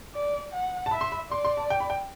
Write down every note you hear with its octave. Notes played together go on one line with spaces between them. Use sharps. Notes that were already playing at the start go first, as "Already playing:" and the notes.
D5
F#5
A5
E5 B5
C6
B5
D5 C6
C6
A5
G5
B5
G5